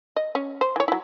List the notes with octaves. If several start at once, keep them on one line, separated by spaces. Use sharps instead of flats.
D#5
C#4
C5
E3 C#5
F#3 E4